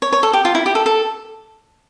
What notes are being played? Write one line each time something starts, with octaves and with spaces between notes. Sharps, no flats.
C#5
C#5
A4
G4
F4
E4
G4
A4
A4